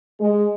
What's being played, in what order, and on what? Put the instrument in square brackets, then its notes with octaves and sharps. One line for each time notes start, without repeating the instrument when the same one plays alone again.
[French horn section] G#3